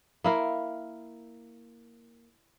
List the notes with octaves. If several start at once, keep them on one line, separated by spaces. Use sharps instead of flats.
A#3 E4 A#4